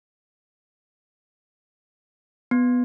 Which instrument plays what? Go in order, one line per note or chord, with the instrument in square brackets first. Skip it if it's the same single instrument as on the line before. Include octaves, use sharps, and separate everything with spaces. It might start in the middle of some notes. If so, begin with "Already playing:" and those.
[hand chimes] B3